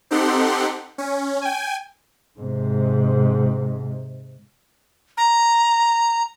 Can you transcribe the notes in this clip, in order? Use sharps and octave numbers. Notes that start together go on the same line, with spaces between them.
C4 D#4 G4 A4 F#5 C6
C#4
G5 G#5
G#2 C3
A#5